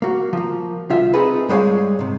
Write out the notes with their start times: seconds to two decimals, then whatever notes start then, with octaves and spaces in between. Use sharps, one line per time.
0.02 A#3 F#4
0.33 F3 A#3
0.90 C2 F4 E5
1.14 C4 D#4 G#4 A4 B4
1.48 G2 G3 G#3 G4 C#5 F5
1.99 G#2 C3